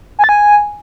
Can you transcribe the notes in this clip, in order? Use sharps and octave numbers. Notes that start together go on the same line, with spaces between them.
G#5
A6
G#5